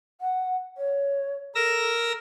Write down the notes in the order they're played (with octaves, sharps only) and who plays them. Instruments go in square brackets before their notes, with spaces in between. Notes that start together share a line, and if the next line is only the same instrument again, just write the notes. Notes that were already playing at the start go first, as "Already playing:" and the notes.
[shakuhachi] F#5
C#5
[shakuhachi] A4 [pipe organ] A#4 E6 A#6